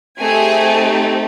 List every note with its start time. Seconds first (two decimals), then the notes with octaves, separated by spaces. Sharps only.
0.19 A3 C4 D#4 G4 G#4 G#5